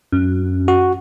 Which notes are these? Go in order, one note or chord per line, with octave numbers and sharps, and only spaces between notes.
F#2
F#4